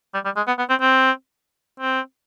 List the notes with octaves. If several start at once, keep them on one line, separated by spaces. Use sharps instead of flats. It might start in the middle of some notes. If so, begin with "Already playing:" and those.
G3
G3
G#3
B3
B3
C4
C4
C4